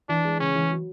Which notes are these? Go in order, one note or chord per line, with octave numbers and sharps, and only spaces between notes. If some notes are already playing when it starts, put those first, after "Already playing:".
E3 D4
G#3
C#3 C#4
E3
F#3